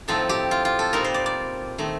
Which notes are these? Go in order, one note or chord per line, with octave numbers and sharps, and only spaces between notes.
A2 F3 C4 D#4 A4
G4
F4
F4
A4
A#2 G3 C4 D#4 A#4
C5
D5
D5
D#3 A3 C4 D#4